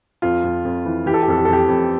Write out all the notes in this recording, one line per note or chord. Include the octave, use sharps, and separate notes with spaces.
F2 F4
F2
F2
E3
E3 G4
A4
G4
F2 A4
G4
A4
F2 G4
F2